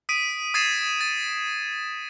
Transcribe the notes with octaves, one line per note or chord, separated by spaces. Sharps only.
D#6 B6 D7 D#7
D#6 G#6 A6 C7 D#7 E7
A6